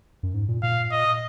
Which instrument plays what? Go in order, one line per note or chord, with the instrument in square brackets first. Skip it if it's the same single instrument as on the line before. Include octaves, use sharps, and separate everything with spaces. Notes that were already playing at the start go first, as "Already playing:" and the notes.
[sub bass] F#2
G#2
A#2
[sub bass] A#2 [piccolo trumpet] F5
[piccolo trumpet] D#5